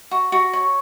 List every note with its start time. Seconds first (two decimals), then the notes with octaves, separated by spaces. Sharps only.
0.11 F#4
0.32 F#4
0.53 C#5